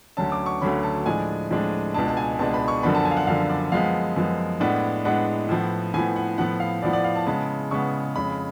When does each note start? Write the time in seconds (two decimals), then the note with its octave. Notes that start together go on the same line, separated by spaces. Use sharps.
0.17 D2 D3 F#3 C#4 A5
0.32 D6
0.46 C#6
0.62 D2 D3 F#3 C#4 B5
0.83 A5
1.06 A2 F3 G#3 D4 G#5
1.51 A2 F3 G#3 D4
1.94 C#2 B2 G#3 D4 A5
2.08 A5
2.17 G#5
2.39 C#2 B2 G#3 D4 A5
2.54 B5
2.68 C#6
2.83 F#2 D3 F3 B3 D4 B5
2.95 A5
3.05 G#5
3.11 F5
3.17 F#5
3.27 F#2 D3 F3 B3 D4 F5
3.50 D5
3.72 F#2 F3 G#3 B3 F5
4.16 F#2 F3 G#3 B3
4.60 A2 G#3 B3 D4
5.05 A2 G#3 B3 D4 F#5
5.49 A2 F3 B3
5.94 A2 F3 B3 G#5
6.16 F#5
6.38 A2 F3 B3 F#5
6.60 F5
6.82 A2 F3 B3 D5
6.93 D5
7.04 F5
7.16 A5
7.27 C#3 G#3 B3 A5
7.71 C#3 G#3 B3 C#6
8.16 F2 C#3 G#3 B5